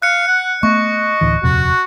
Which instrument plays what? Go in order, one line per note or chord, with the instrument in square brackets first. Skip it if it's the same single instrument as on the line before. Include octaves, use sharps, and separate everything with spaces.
[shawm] F5 [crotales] F#6 C#7
[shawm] F#5
[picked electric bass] A3 B3 [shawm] D#5 [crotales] C#6
[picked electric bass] D1 D2 E3
[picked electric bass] D#1 F2 C3 [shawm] F#4